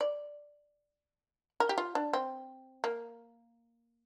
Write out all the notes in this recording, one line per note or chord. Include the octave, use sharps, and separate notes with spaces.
D5
A#4
G4
F4
D4
C4
A#3